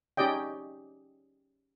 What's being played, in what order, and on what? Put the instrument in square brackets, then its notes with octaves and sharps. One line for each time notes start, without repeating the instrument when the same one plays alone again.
[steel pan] C#4 D#4 G4 D5 D#5 G5